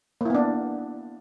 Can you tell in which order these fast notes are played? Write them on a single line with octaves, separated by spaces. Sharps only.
A#3 E4 B3 D4